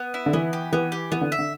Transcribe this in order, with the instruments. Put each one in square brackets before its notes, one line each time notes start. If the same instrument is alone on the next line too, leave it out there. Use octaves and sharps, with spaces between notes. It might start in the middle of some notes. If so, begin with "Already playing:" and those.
Already playing: [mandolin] B3
E4
[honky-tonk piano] D3
[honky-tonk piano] E3 [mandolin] B3
[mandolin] G4
[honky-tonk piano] E3 [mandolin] B3
[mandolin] G4
[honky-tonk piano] E3 [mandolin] B3
[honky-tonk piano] D3
[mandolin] E5
[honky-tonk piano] D3